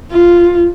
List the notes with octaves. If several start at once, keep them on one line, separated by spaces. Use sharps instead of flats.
F4